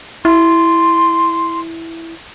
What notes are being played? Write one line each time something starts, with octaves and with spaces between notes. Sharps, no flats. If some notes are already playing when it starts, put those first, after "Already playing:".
E4 C6